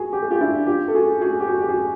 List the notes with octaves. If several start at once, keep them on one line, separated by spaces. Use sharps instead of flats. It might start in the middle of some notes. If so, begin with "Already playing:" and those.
Already playing: F#4 G#4
G4
G#4
F4 G4
D4 E4
F4 G4
A4
F#4 G#4
F#4 G#4
G4
F#4 G#4
G4
F#4 G#4